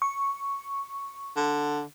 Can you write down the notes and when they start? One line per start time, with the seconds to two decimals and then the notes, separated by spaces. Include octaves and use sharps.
0.02 C#6
1.36 D3